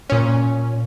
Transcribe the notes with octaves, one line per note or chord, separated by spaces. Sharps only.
A#2 C#4